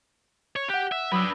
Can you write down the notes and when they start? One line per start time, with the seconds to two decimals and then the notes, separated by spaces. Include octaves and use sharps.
0.56 C#5
0.69 G4 F#5 F#6
0.92 E5
1.12 F#3 D4 B4 B5 D#6 E6